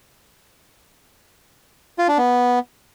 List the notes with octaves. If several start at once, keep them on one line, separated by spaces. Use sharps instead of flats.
F4
D4
B3